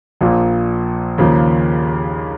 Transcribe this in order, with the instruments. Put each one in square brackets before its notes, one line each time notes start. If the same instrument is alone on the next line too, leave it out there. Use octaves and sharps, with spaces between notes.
[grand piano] A#1 A#2 F3 A#3
D#2 C#3 F3 A#3